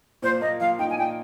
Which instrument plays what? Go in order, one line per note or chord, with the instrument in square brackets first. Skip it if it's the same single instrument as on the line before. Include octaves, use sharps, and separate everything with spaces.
[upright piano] A#2 [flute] C5
[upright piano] A#3 [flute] D#5
[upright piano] F3 [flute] F5
[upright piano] D#4 [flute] G5
[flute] G#5
[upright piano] A#2 [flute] G5